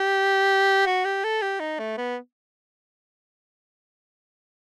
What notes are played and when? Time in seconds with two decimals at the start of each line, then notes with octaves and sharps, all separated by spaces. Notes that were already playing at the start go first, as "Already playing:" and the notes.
Already playing: G4
0.86 F#4
1.05 G4
1.24 A4
1.42 G4
1.60 D#4
1.79 A3
1.97 B3